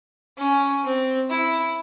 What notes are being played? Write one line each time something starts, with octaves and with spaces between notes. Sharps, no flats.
C#4
C4
E4